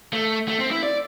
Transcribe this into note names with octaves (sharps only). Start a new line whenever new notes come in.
A3
A3
C4
E4
D5